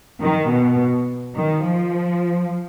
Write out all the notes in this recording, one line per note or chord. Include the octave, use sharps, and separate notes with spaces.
D#3
B2
D#3
F3